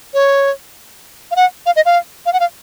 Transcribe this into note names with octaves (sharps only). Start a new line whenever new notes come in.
C#5
F5
F#5
F5
D#5
F5
F5
F#5
F5